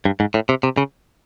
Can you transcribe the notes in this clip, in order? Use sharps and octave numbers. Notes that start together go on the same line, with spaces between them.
G2
G#2
A2
C3
C3
C#3